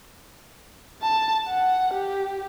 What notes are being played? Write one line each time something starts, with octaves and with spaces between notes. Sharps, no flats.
A5
F#5
G4